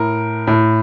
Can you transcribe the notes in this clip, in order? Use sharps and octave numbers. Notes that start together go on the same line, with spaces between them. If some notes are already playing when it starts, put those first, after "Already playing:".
Already playing: A2 A#4
A2